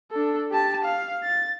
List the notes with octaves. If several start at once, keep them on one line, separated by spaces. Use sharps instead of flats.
D4 A4
G4 A5
F5
A6